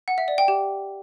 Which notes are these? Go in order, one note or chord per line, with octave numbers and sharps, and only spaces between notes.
F#5
E5
D5
G5
G4